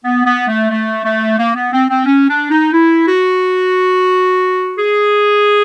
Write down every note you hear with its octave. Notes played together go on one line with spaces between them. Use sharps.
B3
B3
A3
A3
A3
A#3
B3
C4
C4
C#4
D4
D#4
E4
F#4
G#4